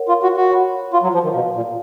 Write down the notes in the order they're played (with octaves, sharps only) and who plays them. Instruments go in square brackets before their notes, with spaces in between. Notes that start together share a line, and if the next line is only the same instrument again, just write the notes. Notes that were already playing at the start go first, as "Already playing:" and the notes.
Already playing: [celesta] A#4 C#5 F#5
[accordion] F4
F#4
F#4
[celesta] C#5 F#5 B5
[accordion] F4
F#3
F3
D#3
[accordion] B2 [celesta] G#4 B4 F5
[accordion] A#2